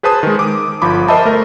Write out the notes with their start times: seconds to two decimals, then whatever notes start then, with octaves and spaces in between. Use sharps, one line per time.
0.03 G#4 B4 C5 A5 D#6
0.23 D#3 G#3
0.39 D6 D#6
0.82 G1 F3 B5 D6
1.08 A#4 C5 D#5 E5 A5 B5
1.25 A3 A#4